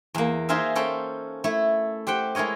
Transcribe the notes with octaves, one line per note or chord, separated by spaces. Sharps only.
E2 A#3
D#4 F4 G#4 A#4 C5 E5
C#4 A4 C5 G5 B5
A3 E4 A4
G4 C5 F#5 G5
G#3 E4 A#4 C#5 D#5